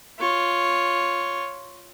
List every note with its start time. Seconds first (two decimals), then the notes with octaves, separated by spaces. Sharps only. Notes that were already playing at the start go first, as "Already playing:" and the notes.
0.19 F4 C#5